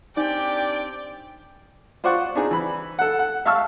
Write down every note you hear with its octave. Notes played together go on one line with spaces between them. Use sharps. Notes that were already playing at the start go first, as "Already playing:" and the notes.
C4 D4 D#4 G4 D5 G5
F4 C5 D5 F#5 C#6
C4 D4 D#4 G#4
E3 B5
A4 F#5
F#5
E5 F5 A5 C#6 E6 F6